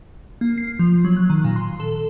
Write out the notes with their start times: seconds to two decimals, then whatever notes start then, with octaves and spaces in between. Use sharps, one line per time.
0.41 A#3
0.58 C7
0.79 F3
1.05 F#3
1.16 F#6
1.30 D#3
1.44 A#2
1.56 C6
1.80 A4